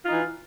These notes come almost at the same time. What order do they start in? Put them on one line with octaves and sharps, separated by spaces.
F4 D#4 E3